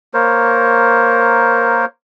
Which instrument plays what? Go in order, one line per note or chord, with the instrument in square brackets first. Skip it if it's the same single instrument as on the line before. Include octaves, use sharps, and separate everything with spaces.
[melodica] A#3 A#4 C5 C#5